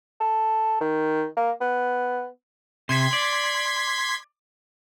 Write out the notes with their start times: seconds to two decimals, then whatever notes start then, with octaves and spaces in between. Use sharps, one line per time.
0.20 A4
0.81 D#3
1.37 A#3
1.61 B3
2.89 C3 C6 G#6 B6
3.13 D5